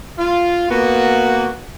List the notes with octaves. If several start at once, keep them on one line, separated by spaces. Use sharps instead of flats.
F4
A#3 B3 F#4